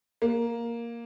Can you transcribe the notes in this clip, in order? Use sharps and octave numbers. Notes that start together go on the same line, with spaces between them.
A#3